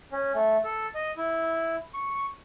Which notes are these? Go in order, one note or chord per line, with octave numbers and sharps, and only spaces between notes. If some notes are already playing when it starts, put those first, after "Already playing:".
C#4
A3
A4
D#5
E4
C#6